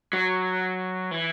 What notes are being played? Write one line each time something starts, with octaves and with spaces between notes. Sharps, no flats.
F#3
E3